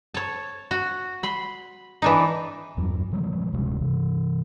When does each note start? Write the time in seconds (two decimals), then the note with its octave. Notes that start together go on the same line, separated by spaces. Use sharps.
0.14 C#5 A5
0.71 F#4
1.23 B5 C6
2.02 E3 D4 D#4
2.77 E2 G2 F#3
3.12 C#3 F3 G3 G#3
3.53 D1 C3 G#3 C#4
3.81 C3 E3